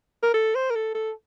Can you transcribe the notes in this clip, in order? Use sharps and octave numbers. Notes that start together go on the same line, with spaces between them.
A#4
A4
C5
A#4
A4
A4